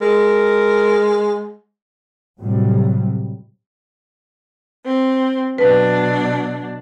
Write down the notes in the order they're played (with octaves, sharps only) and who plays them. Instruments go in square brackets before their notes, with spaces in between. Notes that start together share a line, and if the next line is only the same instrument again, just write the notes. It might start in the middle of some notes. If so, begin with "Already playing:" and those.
[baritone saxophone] G#3 [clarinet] A#4
[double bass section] A2 C3 F#3 G3
[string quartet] C4
[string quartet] B2 F#3 D4 [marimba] B4